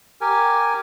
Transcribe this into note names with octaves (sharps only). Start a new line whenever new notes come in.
G4 A#4 G#5